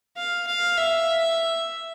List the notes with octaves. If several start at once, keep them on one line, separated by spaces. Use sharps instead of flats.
F5
F5
E5